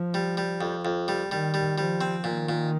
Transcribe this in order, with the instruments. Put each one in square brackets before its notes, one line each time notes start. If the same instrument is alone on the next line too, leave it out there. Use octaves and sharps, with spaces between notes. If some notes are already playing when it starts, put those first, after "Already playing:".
Already playing: [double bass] F3
[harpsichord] G3
G3
F2
F2
G3
[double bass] D#3 [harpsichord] G3
[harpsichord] G3
[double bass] F3 [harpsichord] G3
[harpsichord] C4
[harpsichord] A#2 [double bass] D#3
[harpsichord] A#2